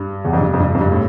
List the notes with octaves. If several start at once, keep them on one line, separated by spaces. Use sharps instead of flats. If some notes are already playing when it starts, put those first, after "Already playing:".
Already playing: G2
E2
F2
G2
F2
G2
F2
G2
A2